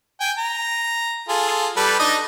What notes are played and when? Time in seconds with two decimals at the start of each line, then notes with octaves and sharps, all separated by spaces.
0.21 G5 G#5
0.38 A#5
1.29 F4 G#4 A4
1.77 G3 A4 B4
1.99 D4 D#4 D#5